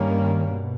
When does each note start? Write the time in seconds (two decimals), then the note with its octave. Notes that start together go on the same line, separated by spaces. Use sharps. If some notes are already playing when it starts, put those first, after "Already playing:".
Already playing: G2 D#3 G3 A#3 C#4
0.47 B2